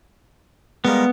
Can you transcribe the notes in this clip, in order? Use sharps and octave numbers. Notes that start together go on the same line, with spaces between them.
G3 G#3 A#3 B3